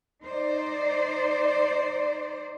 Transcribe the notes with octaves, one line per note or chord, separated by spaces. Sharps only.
D#4 C5 D5